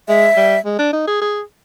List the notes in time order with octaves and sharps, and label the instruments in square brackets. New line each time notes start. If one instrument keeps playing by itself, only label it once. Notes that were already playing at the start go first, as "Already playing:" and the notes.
[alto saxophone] G#3 [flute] E5
[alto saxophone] G3
G#3
D4
D#4
G#4
G#4